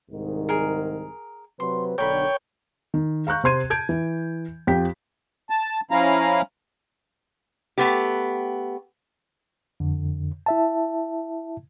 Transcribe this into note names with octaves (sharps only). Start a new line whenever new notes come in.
C2 G#2 D#3
G#4 A#4
C3 F#3 B4 C6
B1 D3 A#4 C#5 G5 B5
D#3
F5 A#5 C#6 F#6 G6
C3 C4 C6 G#6 D#7
A5 G6 G#6 D7
E3
F2 F3 G4 G5 B6
A5
F3 C#4 E4 F5 A#5
A3 B3 G4
F2 D3
E4 E5 A5